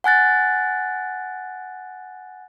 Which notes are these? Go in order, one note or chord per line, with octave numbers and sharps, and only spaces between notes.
F#5 G#5 F#6 A6